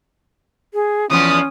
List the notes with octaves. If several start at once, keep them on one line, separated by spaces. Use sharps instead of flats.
G#4
E2 F3 B3 C#4 D#6